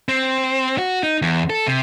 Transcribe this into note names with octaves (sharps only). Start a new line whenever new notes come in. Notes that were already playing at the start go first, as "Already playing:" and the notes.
C4
F#4
D#4
E2
A4
C3